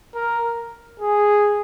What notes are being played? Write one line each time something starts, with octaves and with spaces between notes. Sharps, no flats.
A#4
G#4